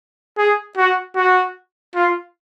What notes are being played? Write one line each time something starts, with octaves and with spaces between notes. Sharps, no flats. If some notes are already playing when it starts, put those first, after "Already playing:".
G#4
F#4
F#4
F4